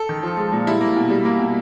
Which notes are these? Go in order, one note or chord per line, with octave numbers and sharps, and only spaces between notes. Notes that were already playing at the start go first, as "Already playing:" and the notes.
Already playing: A4
D#3
F3
G#3
A#2
G3 E4
A#3
B2
G3
A#3
B2